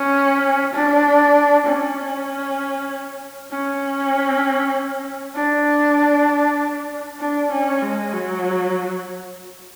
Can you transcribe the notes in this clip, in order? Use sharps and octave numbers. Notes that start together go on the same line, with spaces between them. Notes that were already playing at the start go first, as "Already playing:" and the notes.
Already playing: C#4
D4
C#4
C#4
D4
D4
C#4
G#3
F#3